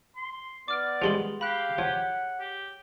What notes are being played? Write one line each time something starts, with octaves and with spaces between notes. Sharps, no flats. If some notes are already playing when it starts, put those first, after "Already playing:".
C6
B3 D5 D6 F6 D7
F3 G3 G#3 G#4 C6 F#7
G4 F5 B5 F#6
F3 C#5 F#5
G4